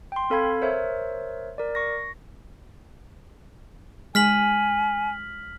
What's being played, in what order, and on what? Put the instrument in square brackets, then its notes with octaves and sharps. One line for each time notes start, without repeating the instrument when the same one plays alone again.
[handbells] G5 C6
C4 A4 F5 B5 G#6
A#4 C5 C#5 E5
A#4 D5
C#6 A#6
[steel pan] G#3 [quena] G#5 [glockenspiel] F6 B6 F#7